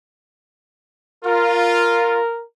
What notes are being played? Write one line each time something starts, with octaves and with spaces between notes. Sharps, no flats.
F4 A#4